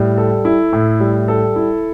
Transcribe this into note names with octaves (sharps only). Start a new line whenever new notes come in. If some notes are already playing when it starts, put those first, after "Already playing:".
Already playing: A2 G3
A4
E4
A2
G3
A4
E4